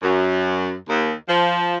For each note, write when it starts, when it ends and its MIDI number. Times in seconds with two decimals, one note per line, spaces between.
0.02 0.73 42
0.87 1.11 39
1.28 1.76 53